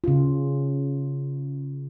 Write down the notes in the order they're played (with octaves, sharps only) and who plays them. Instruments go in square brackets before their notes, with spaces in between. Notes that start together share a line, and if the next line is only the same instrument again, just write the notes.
[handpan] C#3 F4